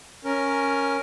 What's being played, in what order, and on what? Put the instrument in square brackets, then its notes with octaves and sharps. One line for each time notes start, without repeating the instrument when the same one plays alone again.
[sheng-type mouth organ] C#4 A#4